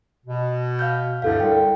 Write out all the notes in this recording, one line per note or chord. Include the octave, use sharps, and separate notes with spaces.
B2
F5 F6 G6
D2 G2 D3 E4 A4 F5
C2 G5